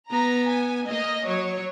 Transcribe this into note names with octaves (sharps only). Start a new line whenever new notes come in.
B3 A#5
G#5
A#3 D#5
F#3 C#5